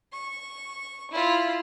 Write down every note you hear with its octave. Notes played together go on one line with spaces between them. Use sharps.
C#6
E4 F4